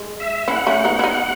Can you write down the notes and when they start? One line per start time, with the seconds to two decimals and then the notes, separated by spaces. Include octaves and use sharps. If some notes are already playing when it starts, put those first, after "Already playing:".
Already playing: G#3
0.20 E5
0.48 C#4 E4 F#5
0.67 A3 C#4
0.85 B3 D#4
0.99 E4
1.03 B3 D#4